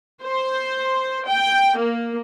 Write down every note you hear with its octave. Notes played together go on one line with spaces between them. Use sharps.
C5
G5
A#3